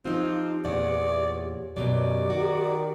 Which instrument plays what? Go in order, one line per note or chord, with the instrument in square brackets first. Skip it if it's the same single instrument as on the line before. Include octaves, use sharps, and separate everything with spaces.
[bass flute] F3 [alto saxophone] C4 [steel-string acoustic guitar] D#4 F4 [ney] G4
[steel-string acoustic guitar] E2 A#2 F#5 [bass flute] C#5 [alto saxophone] D5
[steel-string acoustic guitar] F#2 B2 F#3 [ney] G4 [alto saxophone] D5
[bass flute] D#3 [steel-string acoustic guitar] F#4